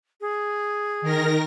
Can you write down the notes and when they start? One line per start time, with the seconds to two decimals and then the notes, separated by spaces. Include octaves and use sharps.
0.21 G#4
1.02 D#3 A#4 A#6